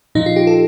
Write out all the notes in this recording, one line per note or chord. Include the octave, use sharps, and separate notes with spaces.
A#2 F3 D#4
F4
G4
A4